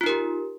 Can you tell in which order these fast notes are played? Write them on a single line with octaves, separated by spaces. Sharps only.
F4 D#4 A#4 G4